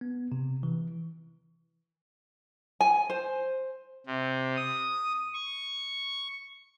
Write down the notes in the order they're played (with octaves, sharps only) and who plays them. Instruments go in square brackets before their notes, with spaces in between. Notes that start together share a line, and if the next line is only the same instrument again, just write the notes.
[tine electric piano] B3
C3
E3
[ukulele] G#5
C5
[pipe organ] C3
D#6
C#6